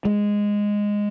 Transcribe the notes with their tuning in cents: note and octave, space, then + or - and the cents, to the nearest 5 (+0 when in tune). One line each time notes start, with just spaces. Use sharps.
G#3 -10